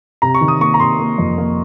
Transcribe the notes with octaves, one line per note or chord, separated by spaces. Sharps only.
C3 A#5
C#6
D#3
D#6
A#3 C#6
A#5
C3 C6
A#3
F2
A#3